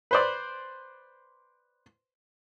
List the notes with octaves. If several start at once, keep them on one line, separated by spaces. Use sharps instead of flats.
B4 C5 D5